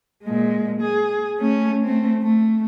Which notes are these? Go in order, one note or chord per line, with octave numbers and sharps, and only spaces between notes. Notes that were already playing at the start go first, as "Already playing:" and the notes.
A#2 G#3
G#4
A3 C#4
A3 C4
A3